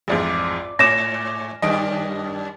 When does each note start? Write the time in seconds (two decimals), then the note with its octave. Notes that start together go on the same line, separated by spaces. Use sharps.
0.08 A1 F2 G#2 F4 D5
0.79 G#2 C#5 D6 A#6 E7
1.62 F#2 D#3 G3 D#5 D7